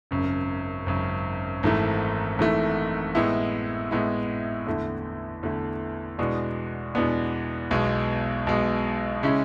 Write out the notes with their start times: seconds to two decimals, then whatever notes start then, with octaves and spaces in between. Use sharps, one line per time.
0.11 G#1 F#2 C#3
0.86 G#1 F#2 C#3
1.63 G#1 G#2 E3 A3
2.39 G#1 G#2 E3 A3
3.15 A2 G#3 B3 E4
3.91 A2 G#3 B3 E4
4.67 E2 D3 A3 E4
5.43 E2 D3 A3 E4
6.18 E2 B2 G#3 B3 D4
6.95 E2 B2 G#3 B3 D4
7.71 B1 B2 G#3
8.47 B1 B2 G#3
9.23 C#3 G#3 C#4 E4